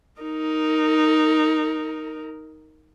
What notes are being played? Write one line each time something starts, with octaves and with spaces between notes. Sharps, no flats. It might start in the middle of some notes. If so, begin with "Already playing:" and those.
D#4 A#4